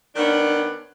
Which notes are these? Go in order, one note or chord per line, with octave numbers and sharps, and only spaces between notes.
D#3 B3 C#4 D4